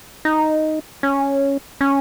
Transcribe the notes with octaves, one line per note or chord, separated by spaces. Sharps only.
D#4
C#4
C#4